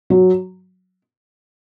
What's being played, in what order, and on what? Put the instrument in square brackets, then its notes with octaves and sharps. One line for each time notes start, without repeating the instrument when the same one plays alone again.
[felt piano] F#3